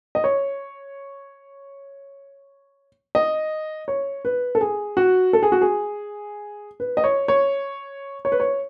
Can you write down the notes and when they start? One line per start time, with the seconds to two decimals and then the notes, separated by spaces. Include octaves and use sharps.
0.15 D#5
0.24 C#5
3.15 D#5
3.88 C#5
4.25 B4
4.55 A4
4.61 G#4
4.97 F#4
5.33 A4
5.43 G#4
5.52 F#4
5.62 G#4
6.80 B4
6.97 D#5
7.04 C#5
7.28 C#5
8.25 C#5
8.32 B4
8.40 C#5